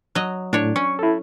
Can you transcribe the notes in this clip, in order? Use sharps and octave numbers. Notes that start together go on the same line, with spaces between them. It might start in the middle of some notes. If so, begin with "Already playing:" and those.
F#3 D#5
A2 D4 C#5
C#4 C#6
E4 A4